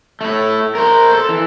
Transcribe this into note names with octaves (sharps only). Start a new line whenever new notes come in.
A3 E4
A#4 C5
A4
E3